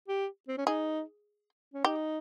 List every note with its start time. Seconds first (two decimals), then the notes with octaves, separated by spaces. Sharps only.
0.08 G4
0.48 C4
0.57 C#4
0.66 D#4 G#4
1.74 C#4
1.84 D#4 G4